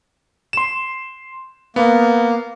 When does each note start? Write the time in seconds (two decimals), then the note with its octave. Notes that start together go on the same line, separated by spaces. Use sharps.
0.53 C6 E7
1.76 A#3 B3